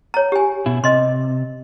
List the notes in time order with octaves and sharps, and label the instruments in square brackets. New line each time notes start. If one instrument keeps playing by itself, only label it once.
[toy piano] C#5 A#5
G4 G#5
[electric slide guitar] B2 E4
[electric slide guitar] C3 [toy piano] D#5 C6